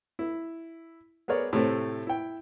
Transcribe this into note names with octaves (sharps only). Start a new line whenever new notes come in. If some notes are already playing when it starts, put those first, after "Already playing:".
E4
B3 G#4 A#4 C#5 D5
A2 C3 A3 C4
E4 G5